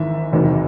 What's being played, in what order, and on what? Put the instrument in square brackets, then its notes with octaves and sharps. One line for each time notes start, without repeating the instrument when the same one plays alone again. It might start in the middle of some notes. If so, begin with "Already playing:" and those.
Already playing: [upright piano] G#1 G#2 E3 E5
F#1 E2 C3 D#3 F#3